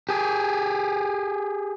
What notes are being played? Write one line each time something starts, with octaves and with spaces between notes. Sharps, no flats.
G4 G#4